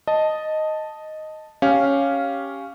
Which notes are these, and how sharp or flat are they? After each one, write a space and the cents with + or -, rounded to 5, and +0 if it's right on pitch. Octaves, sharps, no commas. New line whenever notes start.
D#5 +0 A5 +0
C#4 +0 G4 +0 F5 +0